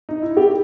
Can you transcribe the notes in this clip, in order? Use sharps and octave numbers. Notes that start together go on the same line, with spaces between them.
D#4
E4
G4